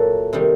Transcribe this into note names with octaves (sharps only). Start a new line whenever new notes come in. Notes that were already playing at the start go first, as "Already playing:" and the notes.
Already playing: A#2 F#3 A3 A4
C3 D#3 G3